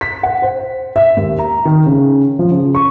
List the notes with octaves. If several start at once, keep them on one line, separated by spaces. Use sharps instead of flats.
B6
F#5
C5
E5
D#2
A#5
D#3
C#3
F3
C#3
C#6